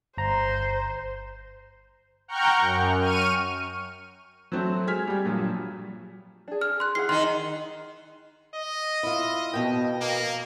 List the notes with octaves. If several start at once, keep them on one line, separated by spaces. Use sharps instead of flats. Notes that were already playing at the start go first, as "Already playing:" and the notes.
G1 C5 A#5
F#5 G5 A#5 C#6 F6 G6
F#2
C#6 F6 D#7
F#3 A3 C4 F#4
G#3 G#5 F6 G#6 B6
G3 G4
G2 A#2 F3 F#3
D4 G#4
F6
C6 F#6
E4 G#4 F#5 C7
D#3 D#4 C6
D#5
E4 F4
F2 B2 G5
A#3